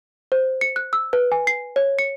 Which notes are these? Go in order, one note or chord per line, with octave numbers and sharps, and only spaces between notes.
C5
C#7
F#6
E6
B4
G#5
C7
C#5
C#7